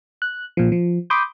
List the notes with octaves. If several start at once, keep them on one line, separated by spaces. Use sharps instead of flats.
F#6
A#2 F3
F3
B5 C6 D6 D#6 G6